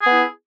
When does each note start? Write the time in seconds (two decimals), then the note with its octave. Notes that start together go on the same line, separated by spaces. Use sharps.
0.02 G#4
0.06 B3
0.11 E4